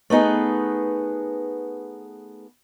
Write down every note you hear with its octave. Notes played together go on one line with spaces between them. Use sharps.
A3 B3 D#4 G#4 B4